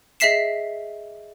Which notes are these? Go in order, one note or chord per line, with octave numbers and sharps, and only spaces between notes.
G#4 D#5 E5 B6 C7 E7